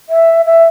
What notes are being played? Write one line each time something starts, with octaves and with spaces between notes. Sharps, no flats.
E5
E5